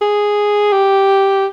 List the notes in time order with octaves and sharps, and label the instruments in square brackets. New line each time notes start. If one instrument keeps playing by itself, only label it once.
[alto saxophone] G#4
G4